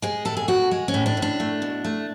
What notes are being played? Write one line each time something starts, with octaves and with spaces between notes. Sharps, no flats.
G#3 G#4
A2 A4
G#4
A2 F#4
G#3
C#4
A2
D4
A2
D4
A3
B2
A3